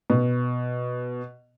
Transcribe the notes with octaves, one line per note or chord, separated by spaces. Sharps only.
B2